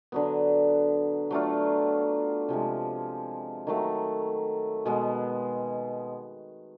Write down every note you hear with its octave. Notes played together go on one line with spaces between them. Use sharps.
D3 F#3 B3
F#3 A3 D4 F4
C3 F3 G#3
D#3 F#3 A3
B2 G#3 B3